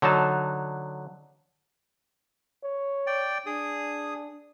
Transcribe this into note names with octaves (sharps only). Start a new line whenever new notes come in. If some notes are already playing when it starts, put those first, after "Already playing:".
D3 F#3 D#4 A5
C#5
D5 G5
D4 G#4 D#6